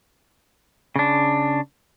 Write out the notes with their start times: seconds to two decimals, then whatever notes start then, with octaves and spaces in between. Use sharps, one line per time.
0.96 C#3 D4